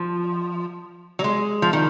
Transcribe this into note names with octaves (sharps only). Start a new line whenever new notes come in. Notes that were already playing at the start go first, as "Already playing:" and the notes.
Already playing: F3
F#3
G#3
F3
D#3